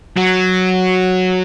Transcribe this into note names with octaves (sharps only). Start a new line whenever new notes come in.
F#3